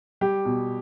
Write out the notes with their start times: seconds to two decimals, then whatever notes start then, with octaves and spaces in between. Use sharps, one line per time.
0.21 G3 G4
0.45 B2